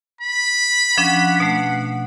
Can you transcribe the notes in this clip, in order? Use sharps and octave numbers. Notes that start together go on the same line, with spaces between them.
B5
F3 C#4 D4 F#5
B2 A3